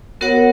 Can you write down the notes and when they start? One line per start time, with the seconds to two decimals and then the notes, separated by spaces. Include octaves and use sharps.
0.21 B3 F#4 A#4 C#5 F#5